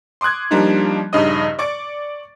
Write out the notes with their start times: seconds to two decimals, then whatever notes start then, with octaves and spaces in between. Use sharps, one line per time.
0.21 C6 D6 D#6 F#6 G#6
0.51 F3 G3 A#3 D4 D#4 F4
1.13 A#1 G2 C#3 D#4 D#5 D#6
1.59 D5 C#6 D6 A6 D7